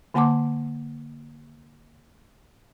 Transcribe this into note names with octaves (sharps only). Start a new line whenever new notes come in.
D3 A#3 F#5 A5 C6 D6